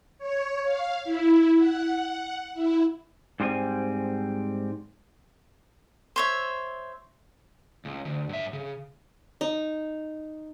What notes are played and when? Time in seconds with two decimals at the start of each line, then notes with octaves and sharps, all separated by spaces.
0.18 C#5
0.64 F5
1.04 E4
1.55 F#5
2.54 E4
3.40 G#2 G3 C4 G#4 G#5
6.16 C5 C#5 E5
7.85 C#2
8.05 D2
8.29 G2 E5
8.53 C#3
9.41 D#4